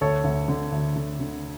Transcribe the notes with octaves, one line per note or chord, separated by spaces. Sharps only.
D2 A4 C#5
D2
D3
D2
D3
D3